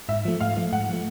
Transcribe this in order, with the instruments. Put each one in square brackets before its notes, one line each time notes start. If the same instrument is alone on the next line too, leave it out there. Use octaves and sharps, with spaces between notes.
[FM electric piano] G#2 [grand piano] E5
[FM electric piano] F3 A3
[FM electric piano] G#2 [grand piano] F5
[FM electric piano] F3 A3
[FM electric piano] G#2 [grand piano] F#5
[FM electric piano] F3 A3